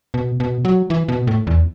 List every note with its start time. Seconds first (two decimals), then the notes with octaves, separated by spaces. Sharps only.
0.14 B2
0.40 B2
0.65 F#3
0.90 E3
1.08 B2
1.27 A2
1.47 E2